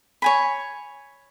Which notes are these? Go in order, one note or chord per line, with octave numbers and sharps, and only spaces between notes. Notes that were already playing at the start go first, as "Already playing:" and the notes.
C#5 G#5 B5